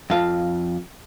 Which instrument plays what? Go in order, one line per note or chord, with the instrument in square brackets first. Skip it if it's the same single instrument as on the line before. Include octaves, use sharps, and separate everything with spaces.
[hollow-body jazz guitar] F2 F5